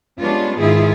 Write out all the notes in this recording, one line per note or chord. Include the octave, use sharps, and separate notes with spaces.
G3 G#3 B3 C#4 D4 F4
G#2 D#3 E4 F4 G#4